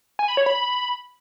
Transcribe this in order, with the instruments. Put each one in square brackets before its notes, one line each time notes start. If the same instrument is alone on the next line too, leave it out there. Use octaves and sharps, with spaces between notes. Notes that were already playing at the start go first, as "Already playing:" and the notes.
[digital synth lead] G#5
B5
C#5
B5